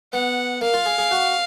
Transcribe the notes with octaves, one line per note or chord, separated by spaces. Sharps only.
B3 F#5
A#3 F5
F4
G#4
G#4
F#4